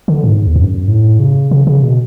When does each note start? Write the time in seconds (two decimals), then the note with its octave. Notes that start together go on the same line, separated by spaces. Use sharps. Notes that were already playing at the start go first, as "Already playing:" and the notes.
0.08 D3
0.24 G#2
0.47 E2
0.56 F#2
0.88 A2
1.19 C#3
1.51 C#3
1.67 C#3
1.82 B2